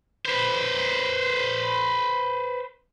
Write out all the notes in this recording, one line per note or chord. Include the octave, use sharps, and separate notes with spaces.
B4 C5